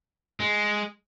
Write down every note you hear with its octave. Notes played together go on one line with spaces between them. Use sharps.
G#3